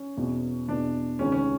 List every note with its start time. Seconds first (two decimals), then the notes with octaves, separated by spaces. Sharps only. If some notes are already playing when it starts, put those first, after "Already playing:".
Already playing: C#4
0.17 E2 B2
0.68 E2 B2 D4
1.19 C#2 C3 D#3 C#4
1.32 C#4